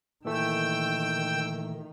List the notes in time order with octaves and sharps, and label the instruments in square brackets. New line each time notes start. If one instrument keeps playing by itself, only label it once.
[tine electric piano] A#2 E3 A3 [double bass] D#3 [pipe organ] G5 E6